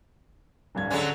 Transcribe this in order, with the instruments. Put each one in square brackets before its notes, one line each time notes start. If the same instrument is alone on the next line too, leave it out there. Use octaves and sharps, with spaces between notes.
[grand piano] D1 G2 G#6
[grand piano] D3 [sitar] F#3 G#3 C#4